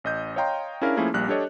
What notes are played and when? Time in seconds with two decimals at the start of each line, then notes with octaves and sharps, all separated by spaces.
0.04 A1 D#5 G6
0.36 C#5 D#5 F5 G5 A#5 C6
0.82 C#4 D4 E4 G#4 A#4 F5
0.97 F3 A3 A#3 C#4 E4 G#4
1.14 A#1 G3 A#3 F#6
1.28 D4 G4 A4 C#5 D#5